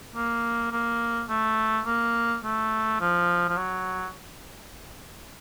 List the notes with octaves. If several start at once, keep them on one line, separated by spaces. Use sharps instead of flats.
A#3
A#3
A3
A#3
A3
F3
F3
F#3